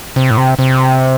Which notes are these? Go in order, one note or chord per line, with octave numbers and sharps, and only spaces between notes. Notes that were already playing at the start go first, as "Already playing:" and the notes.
C3
A2
C3
C3